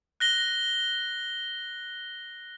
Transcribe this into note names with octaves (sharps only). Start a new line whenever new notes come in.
F#6 A#6 G7